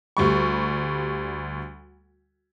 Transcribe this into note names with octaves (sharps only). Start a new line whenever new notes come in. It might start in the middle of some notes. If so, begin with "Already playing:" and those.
D2 G3 C#6